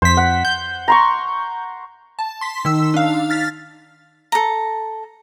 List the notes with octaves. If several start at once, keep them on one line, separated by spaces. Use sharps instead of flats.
F2 C5 B6
F#5
G6
A#5 C6 C#6
A5
C6 B6
D#3 D#4 E6
D4 F5
F6 A6 B6
A4 A#5